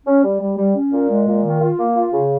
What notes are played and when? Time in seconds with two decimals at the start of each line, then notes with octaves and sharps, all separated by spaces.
0.07 C#4
0.24 G3
0.41 G3
0.58 G3
0.76 C#4
0.93 A#2
1.10 G#3
1.27 A#2
1.44 D#3
1.61 F4
1.78 A#3
1.95 F4
2.12 C#3